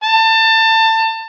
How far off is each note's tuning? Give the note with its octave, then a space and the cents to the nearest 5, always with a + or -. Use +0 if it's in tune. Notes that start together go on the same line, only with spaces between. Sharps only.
A5 +25